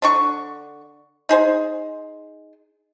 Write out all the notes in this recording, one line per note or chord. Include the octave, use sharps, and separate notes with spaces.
D3 D4 C#6
D#4 G#4 C5